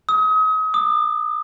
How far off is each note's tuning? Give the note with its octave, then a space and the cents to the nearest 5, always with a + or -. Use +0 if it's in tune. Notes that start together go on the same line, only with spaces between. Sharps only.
D#6 +35
D#6 -45